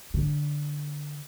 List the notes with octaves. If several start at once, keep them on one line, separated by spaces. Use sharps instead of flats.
D3